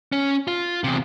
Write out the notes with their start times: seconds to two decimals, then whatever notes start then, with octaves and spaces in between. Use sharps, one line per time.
0.12 C#4
0.48 F4
0.84 E2 C3